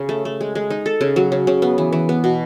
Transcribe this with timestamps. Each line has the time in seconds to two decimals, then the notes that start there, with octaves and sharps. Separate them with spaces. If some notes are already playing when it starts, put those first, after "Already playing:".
Already playing: C#3
0.09 A3
0.25 A3
0.41 G#3
0.55 G#3
0.70 D#4
0.86 A4
1.01 C#3
1.16 F#3
1.32 C#3
1.47 C#3
1.62 B3
1.78 E3
1.92 E3
2.09 B3
2.24 B2